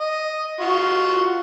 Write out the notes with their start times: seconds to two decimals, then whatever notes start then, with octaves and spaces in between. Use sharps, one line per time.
0.01 D#5
0.60 F4 F#4